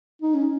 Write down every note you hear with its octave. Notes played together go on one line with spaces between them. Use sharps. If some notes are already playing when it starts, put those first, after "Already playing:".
D#4
C#4